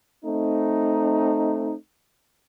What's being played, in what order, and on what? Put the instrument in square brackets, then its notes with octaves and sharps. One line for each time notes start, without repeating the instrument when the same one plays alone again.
[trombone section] A3 C4 D#4